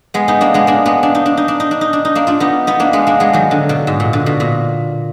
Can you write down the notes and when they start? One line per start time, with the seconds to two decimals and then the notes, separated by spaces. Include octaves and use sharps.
0.14 G#3 B3
0.28 B3 D#4
0.41 A#3 D4
0.54 G#3 B3
0.67 A#3 D4
0.85 G#3 B3
1.03 D4
1.15 D#4
1.26 D4
1.37 D#4
1.48 D4
1.60 D#4
1.71 D4
1.81 D#4
1.93 D4
2.05 D#4
2.15 A#3 D4
2.27 D4 F4
2.40 B3 D#4
2.67 B3 D#4
2.80 A#3 D4
2.93 G#3 B3
3.07 A#3 D4
3.20 G#3 B3
3.33 D#3 F#3
3.51 D3
3.69 B2
3.87 G#2
4.00 A#2
4.13 D3
4.26 B2
4.40 A#2